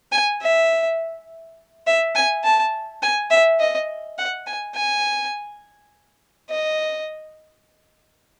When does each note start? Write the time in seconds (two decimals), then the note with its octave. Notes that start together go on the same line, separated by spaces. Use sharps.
0.12 G#5
0.42 E5
1.87 E5
2.15 G#5
2.44 A5
3.03 G#5
3.31 E5
3.60 D#5
4.18 F#5
4.47 G#5
4.75 G#5
6.50 D#5